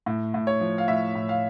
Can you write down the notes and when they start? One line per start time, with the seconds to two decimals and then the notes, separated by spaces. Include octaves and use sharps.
0.06 A2
0.34 A2
0.47 C#5
0.60 F3
0.78 F5
0.88 A2 E5
1.15 A2
1.29 F5